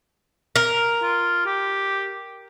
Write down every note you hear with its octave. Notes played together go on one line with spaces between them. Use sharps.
A#4
F4
G4